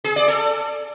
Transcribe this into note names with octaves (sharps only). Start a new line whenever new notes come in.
G#4
D5
A4